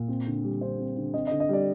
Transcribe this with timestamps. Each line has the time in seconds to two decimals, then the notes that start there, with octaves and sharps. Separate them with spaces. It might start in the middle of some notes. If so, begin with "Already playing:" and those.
Already playing: A#2
0.08 C4
0.26 D3
0.44 G3
0.61 D3 C5
0.79 C4
0.96 D3
1.14 C4 D#5
1.27 D#5
1.31 D3
1.40 D#5
1.49 G3 D5